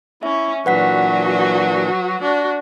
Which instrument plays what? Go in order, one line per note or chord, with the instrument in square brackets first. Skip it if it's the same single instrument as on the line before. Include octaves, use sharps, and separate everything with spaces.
[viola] C#4 [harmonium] E4 [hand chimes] E5
[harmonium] A#2 E3 D4 [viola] F#3 F#4 [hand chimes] B4 F#5 B6
[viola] D4 F#4